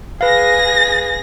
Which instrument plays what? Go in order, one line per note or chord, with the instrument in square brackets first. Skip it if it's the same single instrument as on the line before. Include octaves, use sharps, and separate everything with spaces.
[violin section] G#4 A#6 [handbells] B4 F5